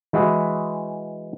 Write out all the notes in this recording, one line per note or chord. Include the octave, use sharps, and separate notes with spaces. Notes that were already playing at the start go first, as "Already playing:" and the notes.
E3 G#3 E4 F#4 G#4